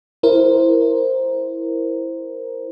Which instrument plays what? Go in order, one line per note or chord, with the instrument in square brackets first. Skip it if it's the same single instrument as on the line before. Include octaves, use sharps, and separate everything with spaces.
[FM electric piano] E4 A#4 C5